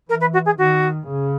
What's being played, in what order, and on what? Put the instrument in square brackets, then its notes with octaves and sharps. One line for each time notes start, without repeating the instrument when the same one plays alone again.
[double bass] E3 [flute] A#4
[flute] B4
F#4
G#4
[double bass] D#3 [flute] F#4
[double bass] C#3